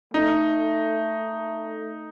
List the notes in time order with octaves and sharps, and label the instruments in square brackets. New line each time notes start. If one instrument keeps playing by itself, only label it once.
[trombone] A3 [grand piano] D#4